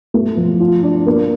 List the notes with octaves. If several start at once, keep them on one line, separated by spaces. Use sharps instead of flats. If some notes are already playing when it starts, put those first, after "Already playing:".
A3
F3
F4
D4
A#3